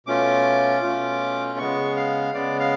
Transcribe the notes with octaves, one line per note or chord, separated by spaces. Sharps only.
B2 A3 C#4 F4 D6
B2 A3 C#4 F4
C#3 G#3 B3 C#6
F5
C#3 G#3 B3 D5
F5